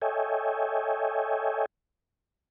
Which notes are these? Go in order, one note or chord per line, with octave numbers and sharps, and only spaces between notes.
A4 C#5 D#5 E5 G5 G#5